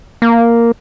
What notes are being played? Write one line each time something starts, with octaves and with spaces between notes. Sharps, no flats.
A#3